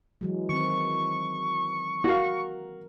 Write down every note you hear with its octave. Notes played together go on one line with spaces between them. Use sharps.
E3 F#3 G#3
D#3 C4 C#6
F#4 A#4 F5